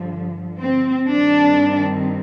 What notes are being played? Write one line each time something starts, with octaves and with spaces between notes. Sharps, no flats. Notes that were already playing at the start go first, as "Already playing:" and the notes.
Already playing: G2 D3 F3
C4
G2 D#3 G3 C4 D4